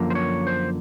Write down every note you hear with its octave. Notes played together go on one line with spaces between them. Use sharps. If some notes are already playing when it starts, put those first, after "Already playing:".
Already playing: F#2 D3 F3 A#3
C5
C#5
C5